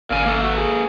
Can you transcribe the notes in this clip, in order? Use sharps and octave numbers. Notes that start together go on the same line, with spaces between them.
G#1 A#2 C#3 F5 G#5
A#3 A4
F#4
G#4